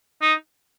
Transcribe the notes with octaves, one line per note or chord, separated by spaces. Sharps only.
D#4